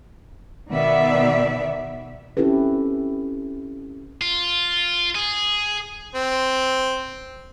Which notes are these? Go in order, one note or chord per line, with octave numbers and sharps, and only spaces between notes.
B2 D#3 B3 D5 E5
C4 C#4 E4 G4 A4 B4
F4
G#4
C4